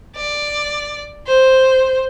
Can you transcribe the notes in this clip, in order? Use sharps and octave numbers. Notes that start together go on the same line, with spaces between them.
D5
C5